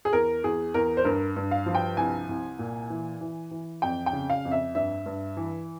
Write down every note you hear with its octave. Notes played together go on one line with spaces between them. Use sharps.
G#4
E2 A#4
E2 G#4
E2 A#4
C5
G2 A#4
G2
F5
F3
G5
C2 G#5
C2
A#2
E3
E3
E3
F2 G5
G5
C#3
F5
F2
E5
G2 E5
G2
E3